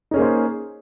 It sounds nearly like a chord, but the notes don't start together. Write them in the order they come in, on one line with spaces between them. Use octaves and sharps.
D#4 C#4 G#4 A#3 C5